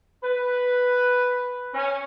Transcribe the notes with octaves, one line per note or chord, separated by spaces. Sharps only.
B4
C#4